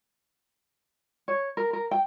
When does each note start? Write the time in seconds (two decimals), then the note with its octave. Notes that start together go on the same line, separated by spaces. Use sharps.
1.28 C#5
1.57 A#4
1.73 A#4
1.91 G5